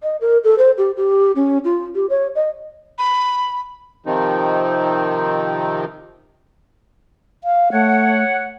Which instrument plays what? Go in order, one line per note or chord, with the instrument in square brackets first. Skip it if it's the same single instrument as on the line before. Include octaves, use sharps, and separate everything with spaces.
[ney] D#5
A#4
A4
C5
G4
G4
C#4
F4
G4
C#5
D#5
[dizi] B5
[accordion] C3 D#3 F3 C4 D#4
[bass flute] F5
[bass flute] A3 [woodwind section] C#5 F#5